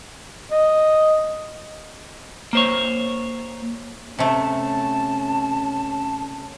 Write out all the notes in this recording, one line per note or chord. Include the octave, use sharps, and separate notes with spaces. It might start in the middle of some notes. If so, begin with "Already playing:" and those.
D#5
A#3 C5 C#5
C3 A3 C#4 A5